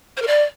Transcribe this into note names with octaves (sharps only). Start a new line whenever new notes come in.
C5
A#4
D5